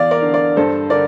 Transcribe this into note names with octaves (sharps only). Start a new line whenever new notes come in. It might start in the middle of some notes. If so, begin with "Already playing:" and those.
Already playing: E2 D5 F5
A#4 D5
D3
A#4 D5
G2 A4 C5
D3 A#4 D5